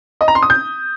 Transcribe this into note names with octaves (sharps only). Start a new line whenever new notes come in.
D#5
A#5
C6
D#6
G6